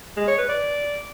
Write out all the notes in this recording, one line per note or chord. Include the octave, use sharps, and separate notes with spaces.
G#3
C#5
B4
D5